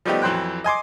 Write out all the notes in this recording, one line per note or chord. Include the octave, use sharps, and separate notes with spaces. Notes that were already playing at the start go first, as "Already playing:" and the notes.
F3 G3 A3 B3 D#4 G4
F2 E3 F#3 C5 G5 F#6
D#5 G#5 C6 D6